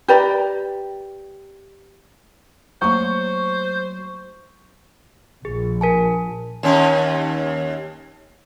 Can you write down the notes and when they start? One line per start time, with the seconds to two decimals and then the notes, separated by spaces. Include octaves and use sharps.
0.08 G4 B4 D5 A#5
2.82 F#3 A3 A#3 C5 A#5 C#6
5.45 A#1 G#4
5.81 A#4 G#5 A5
6.63 D#2 C#4